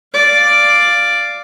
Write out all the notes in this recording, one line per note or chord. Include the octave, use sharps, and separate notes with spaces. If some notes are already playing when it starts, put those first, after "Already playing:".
D5 F5